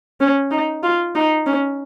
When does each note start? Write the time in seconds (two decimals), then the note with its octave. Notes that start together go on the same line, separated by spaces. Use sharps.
0.21 C#4
0.51 D#4
0.83 F4
1.15 D#4
1.46 C#4